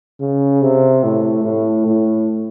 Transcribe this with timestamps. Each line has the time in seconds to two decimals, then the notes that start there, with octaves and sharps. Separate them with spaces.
0.20 C#3
0.62 C3
1.04 A2
1.44 A2
1.86 A2